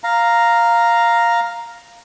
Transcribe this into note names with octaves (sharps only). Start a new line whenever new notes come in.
F5 A#5